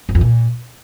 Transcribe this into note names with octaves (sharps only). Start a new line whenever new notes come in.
F#2
F2
A#2